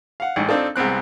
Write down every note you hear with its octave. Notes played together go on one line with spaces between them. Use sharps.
F5 F#5
A1 G#2
C4 D4 D#4 F4 A4
C2 G#3 B3 C4 F#6